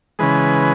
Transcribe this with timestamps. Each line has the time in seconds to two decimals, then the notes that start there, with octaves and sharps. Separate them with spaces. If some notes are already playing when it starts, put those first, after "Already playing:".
0.19 C#3 E3 G#3 B4